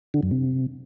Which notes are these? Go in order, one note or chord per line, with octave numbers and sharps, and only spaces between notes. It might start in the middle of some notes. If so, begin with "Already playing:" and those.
D3
F#2
C3